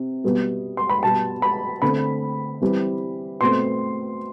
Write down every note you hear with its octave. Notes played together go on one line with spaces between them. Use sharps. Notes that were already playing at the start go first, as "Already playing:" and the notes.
Already playing: C3
B2 G3 B3
C6
B5
B2 G3 B3 A5
B5
D3 A3 C4 B5
E3 G3 C4
B2 A3 C4 C6